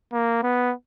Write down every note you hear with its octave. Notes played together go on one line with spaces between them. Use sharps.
A#3
B3